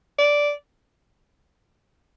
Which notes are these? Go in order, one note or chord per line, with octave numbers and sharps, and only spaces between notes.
D5